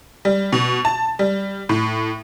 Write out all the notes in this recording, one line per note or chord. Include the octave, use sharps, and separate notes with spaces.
G3
B2
A5
G3
A2